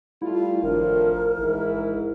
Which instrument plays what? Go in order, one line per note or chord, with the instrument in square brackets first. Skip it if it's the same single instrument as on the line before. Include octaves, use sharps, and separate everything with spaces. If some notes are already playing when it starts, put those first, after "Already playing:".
[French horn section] G3 A3 F4 [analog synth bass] E4
[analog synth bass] G#1 [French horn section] A2 F3 D4 [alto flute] A#4
[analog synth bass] A1 [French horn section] G#2 E4